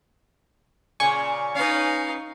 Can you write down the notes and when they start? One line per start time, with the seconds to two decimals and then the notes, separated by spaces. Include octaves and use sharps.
1.00 A#2 C#3 G#5 C#6
1.55 C#4 D#4 B4 F5